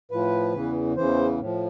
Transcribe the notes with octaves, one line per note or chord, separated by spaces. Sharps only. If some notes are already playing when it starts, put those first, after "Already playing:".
A2 F3 B4
E2 C#3 E3
E2 C#3 E3 C5
A2 F3